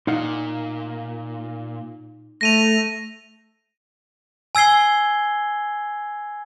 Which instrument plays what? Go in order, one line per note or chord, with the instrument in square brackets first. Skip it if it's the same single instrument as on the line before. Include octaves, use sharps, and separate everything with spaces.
[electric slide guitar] A#2 [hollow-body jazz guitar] D#4 F5 F#5
[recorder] A3 [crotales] A#6 D#7 F7
[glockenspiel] G#5 E6 G#6 C7 G7